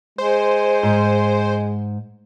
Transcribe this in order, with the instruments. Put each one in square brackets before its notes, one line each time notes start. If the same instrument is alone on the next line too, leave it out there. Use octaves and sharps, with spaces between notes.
[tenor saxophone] G#3 [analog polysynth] C5
[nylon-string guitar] G#2